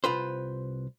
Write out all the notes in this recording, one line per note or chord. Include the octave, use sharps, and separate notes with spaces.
C2 F4 B4 C5